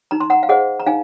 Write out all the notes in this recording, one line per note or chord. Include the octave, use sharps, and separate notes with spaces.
D#4 A#5
C6
F#5 A#5
F5
G#4 C5 D#5 F#5
A#5
D#4 F5 G#5